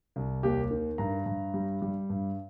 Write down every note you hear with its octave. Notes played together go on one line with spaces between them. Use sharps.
C2
D#2 G4
D#3
G2 A#5
G2
G3
G3
G2